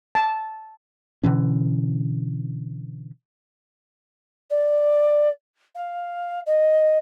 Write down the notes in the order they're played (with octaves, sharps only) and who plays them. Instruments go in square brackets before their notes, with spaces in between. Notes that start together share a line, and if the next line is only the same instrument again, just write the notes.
[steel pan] A5
[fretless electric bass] B2 D3 E3 C#4
[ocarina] D5
F5
D#5